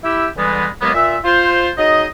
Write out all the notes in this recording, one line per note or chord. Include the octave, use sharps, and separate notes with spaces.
E4 G4 E6
D3 E3 G3 G#3 B3
D#2 F#3 G#3 A#3 B3
A#2 E5
F4 C5
F#3 D#4 G#4 D#5